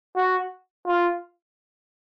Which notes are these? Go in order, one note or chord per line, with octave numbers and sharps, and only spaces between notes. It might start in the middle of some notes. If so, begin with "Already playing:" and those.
F#4
F4